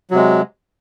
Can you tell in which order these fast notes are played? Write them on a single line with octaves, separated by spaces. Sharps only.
F#3 C3 G#3